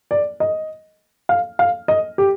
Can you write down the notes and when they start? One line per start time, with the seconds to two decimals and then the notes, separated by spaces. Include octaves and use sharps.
0.11 D5
0.40 D#5
1.29 F5
1.59 F5
1.88 D#5
2.18 G4